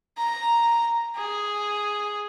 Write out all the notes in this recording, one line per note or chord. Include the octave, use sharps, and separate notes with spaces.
A#5
G#4